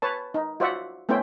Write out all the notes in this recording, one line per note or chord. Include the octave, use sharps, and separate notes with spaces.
B4 C#5 A5
D#4
F4 F#4 C5 D5 E5 F#5
A3 B3 C#4 E4 C5 G5